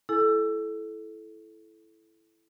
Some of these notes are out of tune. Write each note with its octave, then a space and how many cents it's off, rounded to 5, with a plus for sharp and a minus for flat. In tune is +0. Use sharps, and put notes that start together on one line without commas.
E4 +10 A4 -20 G#5 +0